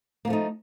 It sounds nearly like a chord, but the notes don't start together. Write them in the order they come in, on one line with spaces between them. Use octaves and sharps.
A#3 F3 A3 D#4